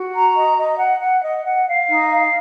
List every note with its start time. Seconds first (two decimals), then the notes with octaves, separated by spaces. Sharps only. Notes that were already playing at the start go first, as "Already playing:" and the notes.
Already playing: F#4
0.13 A#5
0.35 D#5
0.58 D#5
0.79 F#5
1.01 F#5
1.23 D#5
1.46 F#5
1.67 F5
1.90 D#4
2.11 F5